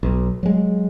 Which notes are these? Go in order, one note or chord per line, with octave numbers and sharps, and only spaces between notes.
B1
F#3 G#3